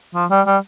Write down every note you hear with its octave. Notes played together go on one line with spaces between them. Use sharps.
F3
G3
G3